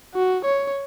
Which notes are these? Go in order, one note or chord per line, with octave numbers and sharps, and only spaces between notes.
F#4
C#5